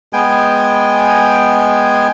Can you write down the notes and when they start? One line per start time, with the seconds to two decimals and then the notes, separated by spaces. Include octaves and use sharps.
0.13 G#3 B3 G5 G#5